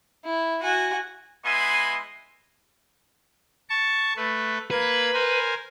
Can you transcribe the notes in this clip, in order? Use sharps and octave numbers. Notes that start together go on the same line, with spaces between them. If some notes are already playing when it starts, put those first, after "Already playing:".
E4
F#4 G#5
G#3 B3 E4 D#5 G#5 C6
A5 C#6
A3 B4
A#3 B4 G#6
A#4 C5 G#5